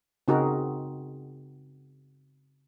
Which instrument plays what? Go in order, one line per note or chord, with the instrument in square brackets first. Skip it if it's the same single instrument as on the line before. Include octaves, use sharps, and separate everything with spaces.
[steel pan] C#3 C4 D#4 F#4 G#4 A#4